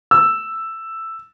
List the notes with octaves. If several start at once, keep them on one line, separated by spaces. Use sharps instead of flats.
E6